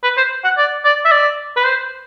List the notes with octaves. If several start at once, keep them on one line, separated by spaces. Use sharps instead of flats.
B4
C5
F#5
D5
D5
E5
D5
B4
C5